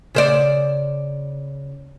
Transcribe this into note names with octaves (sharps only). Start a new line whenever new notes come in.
C#3 C5 D5